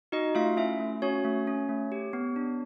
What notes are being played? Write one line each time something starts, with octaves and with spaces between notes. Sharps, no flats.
D#4 F#4 D#5
A3 F4 F5
C#4 E4 E5
A3
C#4 F#4 C#5
A3
C#4
A3
G4
B3
D4